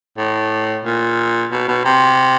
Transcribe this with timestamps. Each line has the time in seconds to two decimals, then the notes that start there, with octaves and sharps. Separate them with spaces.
0.18 A2
0.85 A#2
1.52 B2
1.68 B2
1.85 C3